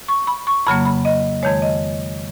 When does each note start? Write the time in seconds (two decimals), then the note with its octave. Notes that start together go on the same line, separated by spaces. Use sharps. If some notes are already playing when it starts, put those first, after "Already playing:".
0.08 C#6
0.27 B5
0.47 C#6
0.67 F2 C#3 F#3 A#3 B5
0.85 B5
1.05 D#5
1.43 F2 D#3 G#3 C#5
1.62 D#5